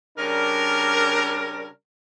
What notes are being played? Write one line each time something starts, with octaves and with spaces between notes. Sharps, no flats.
C#3 G3 D4 A#4